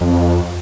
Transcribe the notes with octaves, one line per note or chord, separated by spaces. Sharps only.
F2